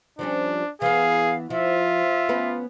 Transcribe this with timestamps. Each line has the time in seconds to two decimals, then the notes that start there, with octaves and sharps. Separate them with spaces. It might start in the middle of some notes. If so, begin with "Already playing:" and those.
0.19 F3 G3 C#4 D4
0.82 E3 B3 G#4 F5
1.50 F3 F4 E5
2.29 B3 C#4 B4